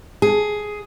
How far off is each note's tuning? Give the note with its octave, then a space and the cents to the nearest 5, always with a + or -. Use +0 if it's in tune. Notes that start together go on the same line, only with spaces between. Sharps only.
G#4 +10